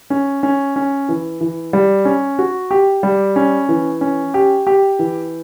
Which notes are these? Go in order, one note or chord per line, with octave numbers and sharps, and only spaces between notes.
C#4
C#4
C#4
E3
E3
G3
C#4
F#4
G4
G3
C#4
E3
C#4
G4
G4
E3